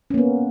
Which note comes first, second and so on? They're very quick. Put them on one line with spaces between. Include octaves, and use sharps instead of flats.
C#4 A#3 B3